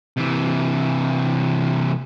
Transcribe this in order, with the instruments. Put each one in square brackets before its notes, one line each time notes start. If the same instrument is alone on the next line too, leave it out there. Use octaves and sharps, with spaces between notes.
[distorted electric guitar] C3 E3